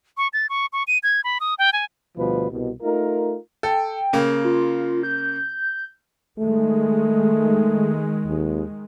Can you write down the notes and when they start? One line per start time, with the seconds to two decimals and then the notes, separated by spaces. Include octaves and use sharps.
0.17 C#6
0.33 A6
0.49 C#6
0.73 C#6
0.88 D#7
1.03 G#6
1.24 B5
1.40 D#6
1.59 G5
1.73 G#5
2.17 D2 B2 F3 G3 B4
2.50 C2 B2
2.82 A3 D#4 F4 A#4
3.63 A4 G5
4.13 C#3 A#3
4.44 F4
5.03 G6
6.39 D#3 G#3 A3
8.27 D#2